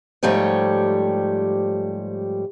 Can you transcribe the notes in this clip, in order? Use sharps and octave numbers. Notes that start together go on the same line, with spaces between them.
G#2 F3 G3 A3 G4 C#5